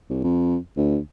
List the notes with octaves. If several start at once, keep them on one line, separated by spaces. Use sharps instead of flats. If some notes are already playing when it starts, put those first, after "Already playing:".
C2
F2
D2